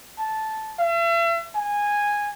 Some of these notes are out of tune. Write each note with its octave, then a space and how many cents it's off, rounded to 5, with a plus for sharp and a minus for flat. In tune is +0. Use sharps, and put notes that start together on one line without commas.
A5 -10
E5 +40
G#5 -10